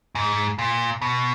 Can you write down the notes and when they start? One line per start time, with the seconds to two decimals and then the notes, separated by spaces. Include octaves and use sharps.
0.15 G#2
0.59 A#2
1.02 B2